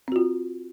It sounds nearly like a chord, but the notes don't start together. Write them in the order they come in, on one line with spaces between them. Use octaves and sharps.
C4 F#4 F4